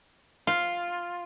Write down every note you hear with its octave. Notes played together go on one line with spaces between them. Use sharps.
F4